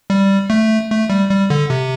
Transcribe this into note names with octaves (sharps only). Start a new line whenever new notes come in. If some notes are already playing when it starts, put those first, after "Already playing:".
G3
A3
A3
G3
G3
D3
C3